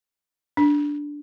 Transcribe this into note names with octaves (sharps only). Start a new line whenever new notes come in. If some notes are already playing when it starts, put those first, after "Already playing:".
D4